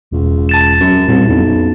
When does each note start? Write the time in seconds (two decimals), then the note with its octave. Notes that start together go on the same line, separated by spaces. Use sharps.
0.12 E1 C#2
0.49 A5 A6 E7
0.81 F#2
1.08 C2 A#2 G3 C#4
1.29 B1 F2 C#4